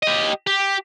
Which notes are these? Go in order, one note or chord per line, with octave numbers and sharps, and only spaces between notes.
G4 D#5
G4